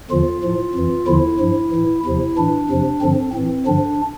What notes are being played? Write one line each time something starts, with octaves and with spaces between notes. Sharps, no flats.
E2 D3 F3 F4
A2 F3
F2 E3
E2 D3 F3 E4
G2 F3
A2 E3
E2 C3 F3 E4
A2 E3 D4
F2 C3 F3
G2 D3 F3 C4
A2 E3 C4
G2 D3 F3 D4